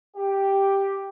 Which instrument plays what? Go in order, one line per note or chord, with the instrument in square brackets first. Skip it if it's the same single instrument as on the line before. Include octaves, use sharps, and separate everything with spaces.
[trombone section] G4